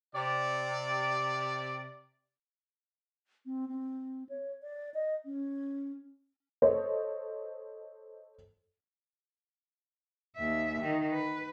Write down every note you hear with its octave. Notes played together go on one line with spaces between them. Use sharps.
C3 D5
C4
C4
C#5
D5
D#5
C#4
A4 C5 C#5 D#5
D#2 E5
D#3
B4